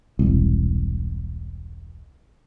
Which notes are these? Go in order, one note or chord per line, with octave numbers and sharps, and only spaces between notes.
E1 C2